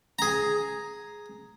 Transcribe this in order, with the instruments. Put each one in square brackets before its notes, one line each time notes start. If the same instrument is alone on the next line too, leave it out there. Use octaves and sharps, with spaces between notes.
[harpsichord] G#4 A#5